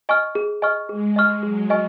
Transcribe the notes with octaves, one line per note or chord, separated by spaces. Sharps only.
D#5 G#5 C#6 F6
G#4
D#5 G#5 C#6 F6
G#3 G#4
D#5 G#5 C#6 F6
F#3 G#4
D#5 G#5 C#6 F6